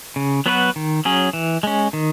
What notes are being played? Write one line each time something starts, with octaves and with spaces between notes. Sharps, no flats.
C#3
F#3 B3 F#4 B4
D#3
F#3 C#4 G#4
E3
G#3 C#4
D#3